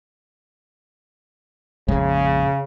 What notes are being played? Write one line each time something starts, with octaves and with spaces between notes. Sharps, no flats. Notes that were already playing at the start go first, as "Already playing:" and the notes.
A#1 F2 C#3 G#3